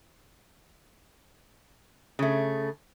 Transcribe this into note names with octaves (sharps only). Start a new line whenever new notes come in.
C#3 A3